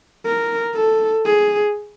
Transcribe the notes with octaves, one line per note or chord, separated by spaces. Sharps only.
A#4
A4
G#4